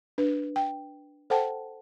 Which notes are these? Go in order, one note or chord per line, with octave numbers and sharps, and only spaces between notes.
D4 B4
G5
A4 C5 F#5 G5 A5